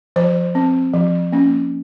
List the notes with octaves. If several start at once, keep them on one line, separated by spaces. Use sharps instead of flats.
F3 C5
C4
F3
A#3 C#4